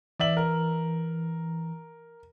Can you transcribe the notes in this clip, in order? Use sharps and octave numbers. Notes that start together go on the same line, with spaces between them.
E3 D5 E5 F#7
A#4